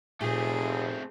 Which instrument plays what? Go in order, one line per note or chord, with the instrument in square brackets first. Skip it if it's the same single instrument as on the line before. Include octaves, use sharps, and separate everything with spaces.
[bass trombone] F1 [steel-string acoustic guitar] A#2 [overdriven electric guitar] A3 C4 [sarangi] G#4